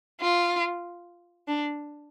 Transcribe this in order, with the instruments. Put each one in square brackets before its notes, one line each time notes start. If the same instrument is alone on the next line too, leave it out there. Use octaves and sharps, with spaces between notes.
[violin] F4
D4